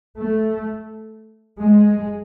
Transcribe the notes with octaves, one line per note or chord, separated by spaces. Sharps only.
A3
G#3